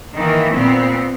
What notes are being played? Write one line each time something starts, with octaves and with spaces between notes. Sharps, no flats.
D#3 E3 A#3
A#2 B3 C4